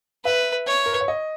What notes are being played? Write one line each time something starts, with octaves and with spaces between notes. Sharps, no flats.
B4 E5
C#5
A#4
B4
C#5
D#5